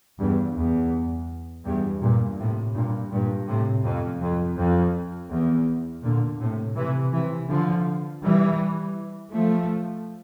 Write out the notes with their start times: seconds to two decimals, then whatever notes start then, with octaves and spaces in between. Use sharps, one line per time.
0.19 E2 G2
0.55 E2
1.65 E2 G2
2.01 G2 A#2
2.39 A2 C3
2.74 G2 A#2
3.11 G2 A#2
3.47 A2 C3
3.85 F2
4.21 F2
4.58 F2
5.30 E2
6.03 A#2 D3
6.40 A2 C3
6.76 C3 E3
7.13 C3 E3
7.49 D3 F3
8.23 E3 G3
9.32 F3 A3